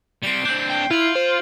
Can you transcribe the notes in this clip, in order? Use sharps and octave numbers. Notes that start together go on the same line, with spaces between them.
G3 C4 C7 D7 G7
C4 D4 G6
G5
E4 F4 F6 F#7
C5